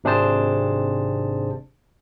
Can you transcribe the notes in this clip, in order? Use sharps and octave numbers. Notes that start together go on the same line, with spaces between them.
G#1 C3 D4 G#4 C5 A5